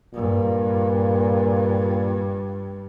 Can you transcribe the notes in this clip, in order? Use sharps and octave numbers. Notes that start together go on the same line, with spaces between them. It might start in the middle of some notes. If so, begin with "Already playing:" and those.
G2 A#2